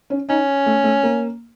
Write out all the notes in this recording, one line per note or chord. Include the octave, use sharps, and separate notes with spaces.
C#4
C#4 D#4
A3
A3
A#3